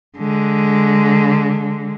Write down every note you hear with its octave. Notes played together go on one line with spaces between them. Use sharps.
D3 G#3